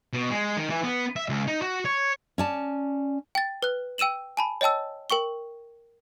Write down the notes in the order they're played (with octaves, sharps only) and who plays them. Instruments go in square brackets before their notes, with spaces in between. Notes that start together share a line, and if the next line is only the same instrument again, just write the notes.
[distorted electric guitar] B2
G#3
D#3
E3
B3
E5
C#2
D#4
F#4
C#5
[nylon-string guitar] C#4 D5 A5
[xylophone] G5 A6
B4 F#6
G5 E6 D#7 E7 F#7
G#5 A5 B5
C#5 D#5 G5 A5 E6
A#4 G5 C#6 G7